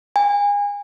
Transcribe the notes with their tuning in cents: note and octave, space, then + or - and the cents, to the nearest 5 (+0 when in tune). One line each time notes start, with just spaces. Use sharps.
G#5 -30